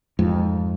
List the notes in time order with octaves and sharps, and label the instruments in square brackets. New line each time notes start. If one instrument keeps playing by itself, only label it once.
[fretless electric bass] F2 G#2